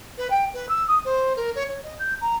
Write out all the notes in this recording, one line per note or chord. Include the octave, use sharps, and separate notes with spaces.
B4
G5
B4
E6
D#6
C5
A#4
C#5
C#5
D#5
G6
A#5